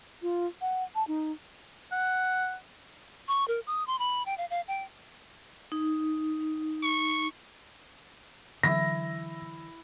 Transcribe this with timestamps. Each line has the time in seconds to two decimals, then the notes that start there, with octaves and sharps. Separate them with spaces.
0.22 F4
0.61 F#5
0.95 A5
1.08 D#4
1.92 F#5
3.28 C#6
3.48 A#4
3.67 D#6
3.87 C6
3.99 B5
4.26 G5
4.38 F5
4.50 F5
4.68 G5
5.72 D#4
6.83 C#6
8.63 D3 E3 F#3 E4 A#6